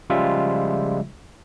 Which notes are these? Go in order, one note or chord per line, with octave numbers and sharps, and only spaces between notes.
C#3 F3 G3 G#3 F4 E5